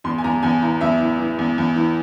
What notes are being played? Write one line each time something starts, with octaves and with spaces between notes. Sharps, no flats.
E2 C6
G#5
E2 A#5
E2 G#5
E3 A#5
E2 E5
E3
E3
E2
E2
E3